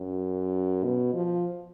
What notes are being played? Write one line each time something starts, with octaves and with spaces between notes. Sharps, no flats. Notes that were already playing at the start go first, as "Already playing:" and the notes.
Already playing: F#2
B2
F3